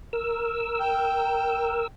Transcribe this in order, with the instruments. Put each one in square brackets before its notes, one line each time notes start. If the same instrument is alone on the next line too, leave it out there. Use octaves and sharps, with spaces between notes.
[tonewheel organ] A#4 E6
[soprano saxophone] G5